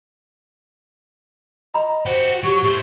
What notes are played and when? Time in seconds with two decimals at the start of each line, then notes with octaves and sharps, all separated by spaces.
1.74 D#5 A#5 B5
2.06 F#4 G4 C5
2.44 F#3 G4 C#6
2.63 A2 G4 C5